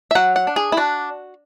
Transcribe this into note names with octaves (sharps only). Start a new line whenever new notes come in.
E5
F#3 F#5
F#5
D4
G#4
E4
D4 F#4